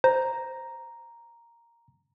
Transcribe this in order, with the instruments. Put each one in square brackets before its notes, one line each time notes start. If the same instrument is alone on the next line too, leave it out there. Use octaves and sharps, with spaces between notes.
[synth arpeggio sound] C5 [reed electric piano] A#5